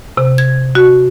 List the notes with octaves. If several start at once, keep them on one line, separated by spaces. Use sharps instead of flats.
C3
G#6
F#4